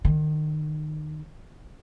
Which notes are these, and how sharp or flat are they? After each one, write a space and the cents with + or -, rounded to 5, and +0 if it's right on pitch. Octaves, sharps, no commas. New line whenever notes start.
D#3 -30